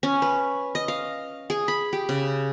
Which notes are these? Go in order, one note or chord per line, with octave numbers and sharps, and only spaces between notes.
C#4
B4
D#5
F5
G#4
B5
G4
C#3